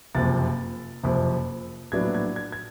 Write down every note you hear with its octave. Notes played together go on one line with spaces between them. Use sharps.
F#1 F2 C3 A6
F#1 F2 C3
A#1 A2 F#3 B3 D4 G#6
G#6
G#6
G#6